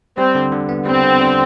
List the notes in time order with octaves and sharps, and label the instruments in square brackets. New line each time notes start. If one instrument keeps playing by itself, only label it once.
[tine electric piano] G3 [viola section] C4
[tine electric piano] D3
D3
B3
[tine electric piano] G3 [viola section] C4
[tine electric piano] D3
D3